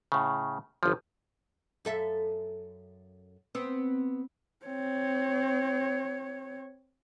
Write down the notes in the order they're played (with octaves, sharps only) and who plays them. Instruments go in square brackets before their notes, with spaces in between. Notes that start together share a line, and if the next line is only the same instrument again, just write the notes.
[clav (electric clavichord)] A2 C#3
G1 F3
[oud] F#2 A4 E5
[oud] B3 [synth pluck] C4
[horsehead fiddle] C4 C#5